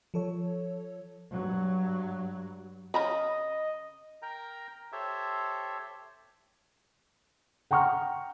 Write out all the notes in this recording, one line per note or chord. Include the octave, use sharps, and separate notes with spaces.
F3 A4 C#5
G2 F#3
C#3 D#5 A#5 B5
A#4 G5 A#5
G4 A4 C5 C#5 E5
F#5 G5 A#5 C#6 F6